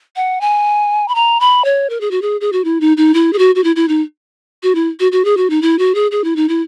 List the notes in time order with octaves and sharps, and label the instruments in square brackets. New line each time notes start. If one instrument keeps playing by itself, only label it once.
[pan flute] F#5
G#5
B5
A#5
B5
C#5
A#4
G#4
F#4
G#4
G#4
F#4
E4
D#4
D#4
E4
G#4
F#4
F#4
E4
E4
D#4
F#4
E4
F#4
F#4
G#4
F#4
D#4
E4
F#4
G#4
G#4
E4
D#4
E4